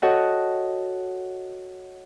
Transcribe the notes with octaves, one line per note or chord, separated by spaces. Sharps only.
F#4 A4 C#5 D#5 F#5 G5